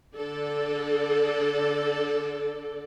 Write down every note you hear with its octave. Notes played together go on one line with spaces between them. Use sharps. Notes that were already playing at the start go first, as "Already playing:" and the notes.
D3 A4 D5